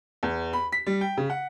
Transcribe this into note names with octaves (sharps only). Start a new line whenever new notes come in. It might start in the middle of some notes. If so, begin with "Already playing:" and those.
E2
B5
B6
G3
G5
C#3
F#5